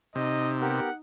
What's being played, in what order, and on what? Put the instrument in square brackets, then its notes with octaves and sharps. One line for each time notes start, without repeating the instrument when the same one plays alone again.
[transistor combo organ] C3 [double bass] D#4 [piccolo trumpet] D#5
[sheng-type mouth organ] B3 G4 A#4 [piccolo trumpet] F#5